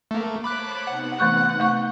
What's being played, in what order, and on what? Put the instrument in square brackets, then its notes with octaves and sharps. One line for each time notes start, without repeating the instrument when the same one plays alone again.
[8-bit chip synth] A3 A#3
[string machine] C5 C#5 A5 [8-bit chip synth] B5 D6 F#6
[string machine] C3 B3 D#4 [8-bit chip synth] F#5
[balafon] E3 A3 C#6 [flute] F#6
[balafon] A3 C#6 [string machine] G6